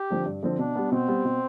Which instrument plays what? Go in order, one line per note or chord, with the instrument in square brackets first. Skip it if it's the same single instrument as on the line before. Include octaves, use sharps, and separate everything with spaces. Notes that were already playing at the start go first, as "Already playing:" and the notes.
Already playing: [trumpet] G4
[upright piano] D3 F3 C4
G2
D3 F3 C4
[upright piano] B2 [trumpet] D4
[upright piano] G3 B3
[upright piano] B2 [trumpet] C4
[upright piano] G3 B3
B2